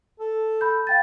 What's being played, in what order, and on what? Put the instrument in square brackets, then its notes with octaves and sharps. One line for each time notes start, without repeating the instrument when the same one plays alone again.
[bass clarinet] A4
[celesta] B5 G6
F5 G5 A6